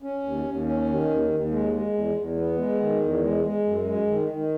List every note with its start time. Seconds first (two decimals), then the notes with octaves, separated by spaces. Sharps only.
0.02 C#4
0.23 D#2
0.45 D#2
0.66 C#4
0.88 D#3
1.08 D#2
1.30 D#2
1.51 G#3
1.73 G#3
1.93 E2
2.15 E2
2.37 B3
2.58 G#3
2.79 D#3
3.00 E2
3.22 G#3
3.43 G#3
3.64 F#2
3.86 G#3
4.07 D#3
4.28 D#3